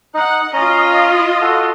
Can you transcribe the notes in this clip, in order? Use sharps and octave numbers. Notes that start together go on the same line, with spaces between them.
D#4 F#5
C#4 F4 D#5 A#5
F#4 A4